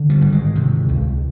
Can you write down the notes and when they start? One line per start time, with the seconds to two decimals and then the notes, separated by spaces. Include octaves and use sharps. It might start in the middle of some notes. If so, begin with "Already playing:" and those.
Already playing: D3
0.10 G3
0.22 G#1
0.32 G#3
0.55 C3
0.89 C#2